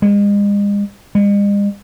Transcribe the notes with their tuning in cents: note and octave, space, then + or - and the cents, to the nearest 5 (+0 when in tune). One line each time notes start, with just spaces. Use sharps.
G#3 -40
G#3 -45